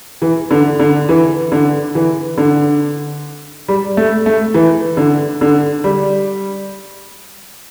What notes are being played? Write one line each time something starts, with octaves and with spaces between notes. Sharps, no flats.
E3
D3
D3
E3
D3
E3
D3
G3
A3
A3
E3
D3
D3
G3